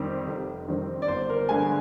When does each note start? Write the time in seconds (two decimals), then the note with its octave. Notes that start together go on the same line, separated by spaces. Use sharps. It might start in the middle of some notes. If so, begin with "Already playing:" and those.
Already playing: F2 D#3 G3 C4
0.27 F1
0.68 F2 D#3 G3 C4
1.02 D5
1.08 G1 C5
1.30 A#4
1.49 G2 D3 G#3 G#5